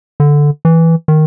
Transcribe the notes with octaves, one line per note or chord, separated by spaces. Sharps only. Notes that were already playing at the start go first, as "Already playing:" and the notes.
D3
E3
D#3